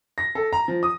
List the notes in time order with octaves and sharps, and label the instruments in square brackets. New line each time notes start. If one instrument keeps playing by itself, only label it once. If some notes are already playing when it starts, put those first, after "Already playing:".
[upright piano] A#6
A4
A#5
F3
D#6